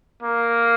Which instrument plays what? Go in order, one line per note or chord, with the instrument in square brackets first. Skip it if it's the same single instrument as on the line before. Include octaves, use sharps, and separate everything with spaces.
[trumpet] A#3